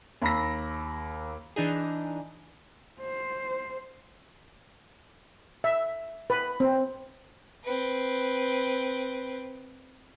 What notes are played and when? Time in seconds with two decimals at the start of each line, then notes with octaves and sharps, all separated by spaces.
0.22 D#2 A#5 B5 E6 A#6
1.56 E3 D4 D#4 G#4
3.01 C5
5.64 E5
6.30 B4
6.60 C4
7.64 C4 B4